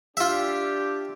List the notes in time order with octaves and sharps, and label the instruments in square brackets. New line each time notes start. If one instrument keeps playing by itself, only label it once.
[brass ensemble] D4 G4 [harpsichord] F4 E5